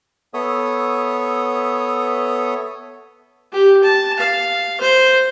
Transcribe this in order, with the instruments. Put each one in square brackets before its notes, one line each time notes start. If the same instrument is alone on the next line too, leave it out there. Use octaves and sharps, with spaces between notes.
[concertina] B3 A4 C#5 E5 D#6
[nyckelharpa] G4
A5
F5
C5